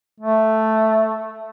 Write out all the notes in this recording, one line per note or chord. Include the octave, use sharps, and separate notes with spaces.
A3